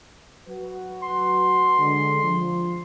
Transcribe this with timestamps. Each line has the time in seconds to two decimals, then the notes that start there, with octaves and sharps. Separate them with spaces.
0.48 F#3 F#4 B4
1.03 C6
1.78 D3 G#3
2.22 F3